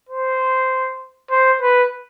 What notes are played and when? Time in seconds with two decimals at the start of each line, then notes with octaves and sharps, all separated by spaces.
0.09 C5
1.31 C5
1.62 B4